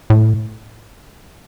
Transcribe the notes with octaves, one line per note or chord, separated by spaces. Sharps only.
A2